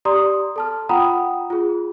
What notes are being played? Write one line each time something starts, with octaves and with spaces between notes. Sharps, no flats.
G4 D5 A#5 C6 D#6
A4 A5 F6
F4 F#5 G5 A#5 B5 D#6
F4 G#4